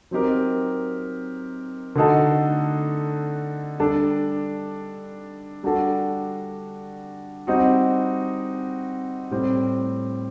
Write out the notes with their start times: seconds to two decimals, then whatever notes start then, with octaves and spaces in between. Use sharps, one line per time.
0.11 F#3 C4 D#4 G4 A#4
1.95 D3 A3 D#4 F#4 A4
3.79 G3 D4 A4
5.63 G3 D4 F#4 A4
7.47 G3 C4 D#4 F#4
9.31 A2 G3 C4